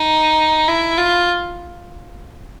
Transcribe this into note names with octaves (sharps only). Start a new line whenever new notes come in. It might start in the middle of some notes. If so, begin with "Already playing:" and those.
Already playing: D#4
E4
F4